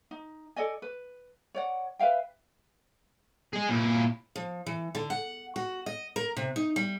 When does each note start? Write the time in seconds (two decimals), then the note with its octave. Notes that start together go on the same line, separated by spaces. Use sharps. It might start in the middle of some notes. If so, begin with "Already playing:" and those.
0.11 D#4
0.56 A4 D5 D#5 G#5
0.82 B4
1.55 C#5 D5 F#5
1.99 B4 E5 F5 G5
3.53 G#4 D#5
3.69 A#2 E4
4.36 F3
4.66 E3
4.95 D3
5.10 F#5
5.56 F#4
5.86 D#5
6.16 A#4
6.37 C3
6.56 D#4
6.76 G3